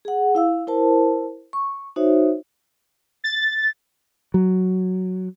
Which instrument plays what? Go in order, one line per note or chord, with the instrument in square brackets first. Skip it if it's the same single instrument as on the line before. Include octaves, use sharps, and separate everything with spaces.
[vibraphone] G#4 F#5
E4 F5 E6
E4 A#4 C5 A5
C#6
D#4 F#4 C5 C#5 E5
[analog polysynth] A6
[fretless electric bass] F#3